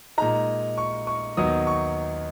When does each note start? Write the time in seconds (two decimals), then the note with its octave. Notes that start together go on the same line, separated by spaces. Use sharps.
0.18 A#2 G#3 D#4 A#5
0.78 C#6
1.07 C#6
1.37 D#2 D#3 F#3 B3 D#4 D#6
1.67 C#6